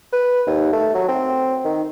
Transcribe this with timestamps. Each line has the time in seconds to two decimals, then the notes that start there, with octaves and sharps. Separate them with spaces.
0.13 B4
0.47 D#2
0.72 A3
0.95 F#3
1.09 C4
1.65 D#3